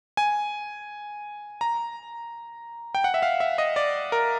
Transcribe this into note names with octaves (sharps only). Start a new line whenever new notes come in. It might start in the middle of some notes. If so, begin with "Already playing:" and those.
G#5
A#5
G5
F#5
E5
F5
E5
D#5
D5
A#4